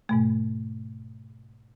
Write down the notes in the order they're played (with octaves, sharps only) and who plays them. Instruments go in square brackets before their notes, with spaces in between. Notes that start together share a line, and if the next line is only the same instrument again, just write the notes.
[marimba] G#2 B2 A3